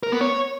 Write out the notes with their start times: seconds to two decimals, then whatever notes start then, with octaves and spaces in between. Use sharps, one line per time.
0.03 A#4
0.12 B3
0.21 C#5